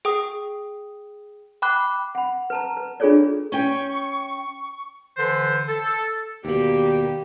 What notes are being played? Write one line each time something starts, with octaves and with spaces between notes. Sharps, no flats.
G#4 G5 D#6
G5 B5 D6 F#6
F#5 B5
B4 A5 A#5
B4
D4 F4 G#4 A4 C#5 D5
C#4 G5 C#6
D3 E3 A4 B4 C5
A4
D#2 B2 D#3 G3 A#3 G4